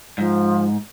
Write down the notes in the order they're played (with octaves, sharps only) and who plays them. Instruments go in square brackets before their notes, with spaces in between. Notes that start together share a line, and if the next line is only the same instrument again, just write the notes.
[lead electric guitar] G#2 [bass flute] F3